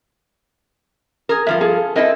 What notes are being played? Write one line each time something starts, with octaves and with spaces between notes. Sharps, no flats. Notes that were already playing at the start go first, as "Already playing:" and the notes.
G#4 A#4
G2 F3 F4 E5
G#4 A4
C4 E4 A4 A#4 D#5